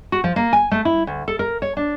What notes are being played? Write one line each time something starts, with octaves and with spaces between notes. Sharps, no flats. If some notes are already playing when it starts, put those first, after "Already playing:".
F#4
F3
A#3
G#5
A3
E4
D2
A4
A#4
C#5
D4